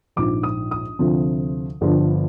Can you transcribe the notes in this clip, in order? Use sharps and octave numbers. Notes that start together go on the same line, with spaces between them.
A#1 G#2 F3 D6
D#6
D#6
D2 C3 F3
G1 G2 D3 F3